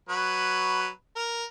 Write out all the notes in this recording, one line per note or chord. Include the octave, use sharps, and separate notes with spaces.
F#3 B4
A#4